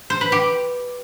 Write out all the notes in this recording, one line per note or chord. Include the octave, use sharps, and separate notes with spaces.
C5
B4
G4